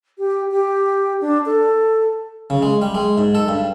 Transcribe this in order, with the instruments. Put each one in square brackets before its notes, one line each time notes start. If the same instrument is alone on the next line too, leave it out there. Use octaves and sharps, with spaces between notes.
[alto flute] G4
G4
D4
A4
[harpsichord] C#3
G#3
G3
G#3
G#2
A4
G2